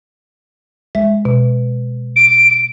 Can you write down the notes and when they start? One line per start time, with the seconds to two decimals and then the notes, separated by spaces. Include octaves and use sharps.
0.95 G#3 E5
1.25 B2
2.16 D7